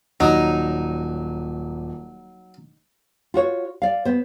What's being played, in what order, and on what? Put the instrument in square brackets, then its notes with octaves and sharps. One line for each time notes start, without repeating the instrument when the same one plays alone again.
[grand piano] D#1 [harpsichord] F#3 [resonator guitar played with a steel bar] D#4
[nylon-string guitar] F4 F#4 C#5
D5 F5
B3 C5